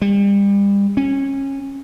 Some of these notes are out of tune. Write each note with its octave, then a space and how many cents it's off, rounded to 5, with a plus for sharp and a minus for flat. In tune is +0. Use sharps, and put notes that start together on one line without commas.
G3 +35
C#4 -20